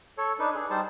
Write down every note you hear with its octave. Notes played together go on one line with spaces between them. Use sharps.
A4 C#5
D4 D#4 B4
G#4
G3 D#4 C5 A5